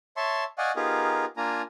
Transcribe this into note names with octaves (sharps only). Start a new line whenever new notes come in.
C#5 E5 A5 C6 C#6
D5 D#5 F5 F#5 G#5 C#6
B3 D#4 F4 G4 G#4 A#4
A#3 D4 F4 G#5 A#5